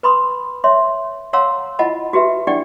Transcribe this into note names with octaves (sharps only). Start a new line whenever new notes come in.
B4 B5 C6 D#6
C#5 E5 C6
C#5 F5 F#5 A#5 C6 E6
E4 F4 D#5 F#5 A5 B5
F#4 G4 B4 E5
D4 E4 G4 D5 F#5 G5